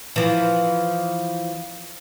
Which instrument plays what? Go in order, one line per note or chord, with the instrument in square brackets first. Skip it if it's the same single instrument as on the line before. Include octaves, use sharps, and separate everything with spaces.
[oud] E3 F3